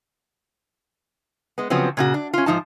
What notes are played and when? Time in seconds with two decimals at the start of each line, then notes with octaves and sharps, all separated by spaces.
1.58 G#3 B3
1.70 C#3 F3 F#3 B3 C4
1.97 A#2 C#3 F#4
2.14 D4
2.33 C#4 F4
2.46 G#2 F3 D#4 A5